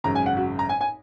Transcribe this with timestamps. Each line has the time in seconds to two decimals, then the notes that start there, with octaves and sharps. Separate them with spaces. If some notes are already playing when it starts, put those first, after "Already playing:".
0.04 G#1 F#2 C#3 A#5
0.15 G#5
0.26 F#5
0.37 F#4
0.59 A#5
0.69 G#5
0.81 G#5